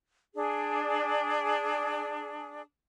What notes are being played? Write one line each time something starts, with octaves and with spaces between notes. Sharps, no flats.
D4 G#4